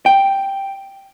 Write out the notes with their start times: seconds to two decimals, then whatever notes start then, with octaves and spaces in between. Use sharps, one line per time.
0.06 G5